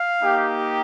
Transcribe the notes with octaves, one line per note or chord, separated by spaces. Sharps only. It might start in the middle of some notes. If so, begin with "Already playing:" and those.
Already playing: F5
A#3 D#4 G4